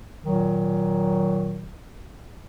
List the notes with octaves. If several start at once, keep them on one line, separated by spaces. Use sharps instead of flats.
A#2 D#3 F#3